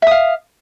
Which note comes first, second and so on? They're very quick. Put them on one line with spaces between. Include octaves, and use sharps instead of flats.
E5 D#6 F5